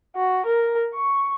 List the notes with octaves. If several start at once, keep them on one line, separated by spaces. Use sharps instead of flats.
F#4
A#4
C#6